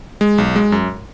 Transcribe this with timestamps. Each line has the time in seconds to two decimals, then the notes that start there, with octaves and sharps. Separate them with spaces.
0.21 G#3
0.38 B1
0.56 G#3
0.72 F#2